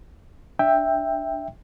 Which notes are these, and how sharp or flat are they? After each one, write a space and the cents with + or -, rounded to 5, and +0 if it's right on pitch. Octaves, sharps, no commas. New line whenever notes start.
D4 +0 E5 +0 G5 +10